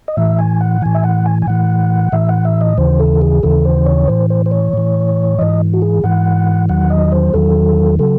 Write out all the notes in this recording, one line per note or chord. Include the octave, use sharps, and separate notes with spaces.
D#5
A2 E3 E5
G#5
F#5
A2 E3 G#5
E5
F#5
G#5
G#5
A2 E3 F#5
A2 E3 E5
F#5
E5
D#5
D#2 C#3 E3 C5
A4
G#4
D#2 C#3 E3 A4
C5
C#5
A2 E3 C5
C5
C5
C#5
A2 E3
G#2 E3 D#5
F#4
G#4
G#2 E3 F#5
E2 D#3 F#3 F#5
D#5
C5
E2 D#3 F#3 A4
C#3 F#3 A4